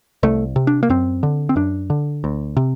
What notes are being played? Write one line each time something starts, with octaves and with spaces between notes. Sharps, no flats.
C2 A3
C3
D4
A#3
F#2 C4
D3
C4
F#2 D4
D3
D2
C3